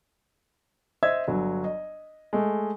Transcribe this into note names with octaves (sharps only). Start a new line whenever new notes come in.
C5 D#5 E5 E6 G#6
G1 F#3
D#5
G#3 A3